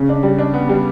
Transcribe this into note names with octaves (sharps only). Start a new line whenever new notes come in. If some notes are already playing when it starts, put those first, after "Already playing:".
Already playing: C#3
D4
G3
D4
B3
G3